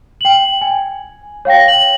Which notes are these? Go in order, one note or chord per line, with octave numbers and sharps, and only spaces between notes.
G5 F#7
G#5
C#5 F5 G5 A#6
F#7